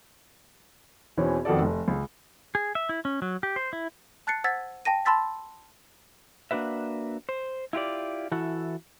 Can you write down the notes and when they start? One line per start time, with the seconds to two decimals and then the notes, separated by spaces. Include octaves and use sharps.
1.17 E2 B2 E3 C4 C#4
1.45 F2 D#3 B3 F#4 A4 D5
1.62 F1
1.88 C#2
2.55 G#4
2.75 E5
2.89 E4
3.05 C#4
3.22 F#3
3.43 G4
3.56 C5
3.73 E4
4.27 A5 F#6 A6 C7 C#7
4.44 C5 F#5 E6 G#6 A6 B6
4.85 G5 A5 A#6 D#7
5.05 A5 B5 C6 E6 A6 B6
6.51 A#3 D4 F#4 B4 E5
7.29 C5
7.73 E4 F4 G4 D5
8.32 E3 E4 F#4 A4